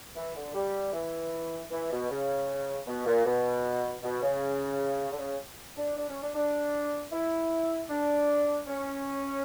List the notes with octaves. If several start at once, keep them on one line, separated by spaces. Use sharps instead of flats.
E3
D3
G3
E3
E3
B2
C#3
B2
A#2
B2
B2
C#3
D3
C#3
D4
D4
C#4
D4
D4
E4
D4
C#4